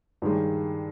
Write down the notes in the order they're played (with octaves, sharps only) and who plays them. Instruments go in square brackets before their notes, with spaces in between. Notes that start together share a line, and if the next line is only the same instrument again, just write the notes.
[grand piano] G2 D#3 G#3